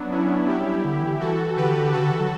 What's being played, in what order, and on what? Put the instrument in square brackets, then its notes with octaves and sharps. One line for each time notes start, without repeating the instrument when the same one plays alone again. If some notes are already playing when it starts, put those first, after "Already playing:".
Already playing: [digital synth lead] F#3 [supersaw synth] B3 D4
[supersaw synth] C#4 E4
[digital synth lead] F#3 [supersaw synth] E4 G4
[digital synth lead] G3
G3
D3
E3
[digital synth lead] E3 [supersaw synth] F#4 A4
[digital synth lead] D3 [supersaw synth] G4 B4
[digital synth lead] C#3 [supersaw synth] F#4 A4
[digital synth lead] D3
E3
F#3